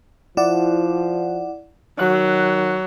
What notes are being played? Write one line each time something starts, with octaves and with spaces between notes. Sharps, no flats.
F3 E4 D5 F#5
D#3 F#3 F#6